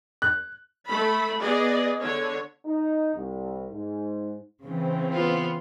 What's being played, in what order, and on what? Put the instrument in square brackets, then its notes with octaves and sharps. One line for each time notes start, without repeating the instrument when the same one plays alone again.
[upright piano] F#6
[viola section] A3 B5
B3 G#4 D5 D#5
D3 C#5
[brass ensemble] D#4
C2
G#2
[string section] C#3 E3 C4
[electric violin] B3 F4